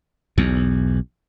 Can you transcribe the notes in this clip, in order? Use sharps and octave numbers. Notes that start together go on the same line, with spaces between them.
B1 E2